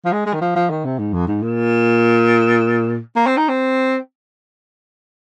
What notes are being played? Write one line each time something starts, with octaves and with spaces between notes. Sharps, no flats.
F3
G#3
G#3
D#3
F3
F3
D#3
C3
G#2
F2
G#2
A#2
A#3
C4
D#4
C4